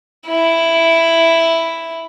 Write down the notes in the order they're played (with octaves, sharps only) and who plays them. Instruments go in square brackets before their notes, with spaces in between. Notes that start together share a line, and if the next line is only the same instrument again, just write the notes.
[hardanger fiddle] E4